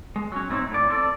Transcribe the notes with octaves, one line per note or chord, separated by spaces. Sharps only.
G#3
F#3 C#4
A2 F#3 C4 D#4 E4
A2 D5
C4 D4 A4 D5